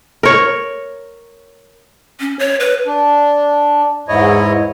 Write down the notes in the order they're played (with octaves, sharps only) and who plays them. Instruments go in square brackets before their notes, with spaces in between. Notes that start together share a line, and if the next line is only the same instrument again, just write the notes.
[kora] A#4 C#5
[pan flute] C#4
C#5
B4
[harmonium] D4
E2 G#2 E4 C#5 D#5